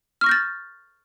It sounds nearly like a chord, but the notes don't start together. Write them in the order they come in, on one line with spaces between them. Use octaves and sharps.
F6 C#6 A#6 G6 A6